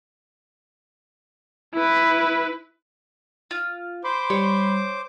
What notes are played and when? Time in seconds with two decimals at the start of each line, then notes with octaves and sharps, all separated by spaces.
1.74 E4 B4
3.51 F4
4.04 C5 B5 C6 D6
4.30 G3 C#5